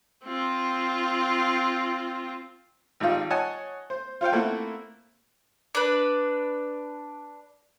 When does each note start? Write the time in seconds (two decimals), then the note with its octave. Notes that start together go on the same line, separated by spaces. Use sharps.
0.24 C4 F4
3.00 G#1 G3 D#4 F4
3.30 C#5 D#5 F#5 G#5 A5
3.90 C5
4.21 F4 C5 F5 G5
4.32 A3 A#3 C4 E4 E5 F#5
5.75 D4 B4